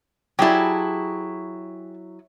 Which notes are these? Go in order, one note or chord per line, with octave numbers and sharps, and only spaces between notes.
F#3 E4 G4 G#4 A5